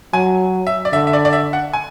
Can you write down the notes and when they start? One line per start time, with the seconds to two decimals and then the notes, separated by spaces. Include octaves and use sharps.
0.13 F#3 G#5
0.67 E5
0.85 D5
0.93 D3 E5
1.07 E5
1.13 D5
1.25 D5
1.33 E5
1.53 F#5
1.73 G#5